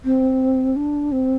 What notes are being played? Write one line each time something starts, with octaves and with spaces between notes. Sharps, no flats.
C4
D4
C4